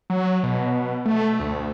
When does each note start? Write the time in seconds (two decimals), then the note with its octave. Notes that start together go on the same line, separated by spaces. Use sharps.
0.10 F#3
0.43 B2
1.06 A3
1.40 D2